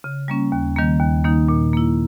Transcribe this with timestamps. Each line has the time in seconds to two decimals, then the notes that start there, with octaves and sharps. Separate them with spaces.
0.04 C#3
0.28 G3 A#3 C#4
0.52 D#2
0.76 D#3 G3 A#3
1.00 D#2
1.24 D#3 A#3 D#4
1.48 A#2
1.73 A#3 E4